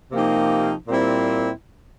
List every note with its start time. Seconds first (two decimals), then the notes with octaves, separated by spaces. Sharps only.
0.12 C3 F3 A#3 D#4 G4
0.88 A#2 G3 C4 E4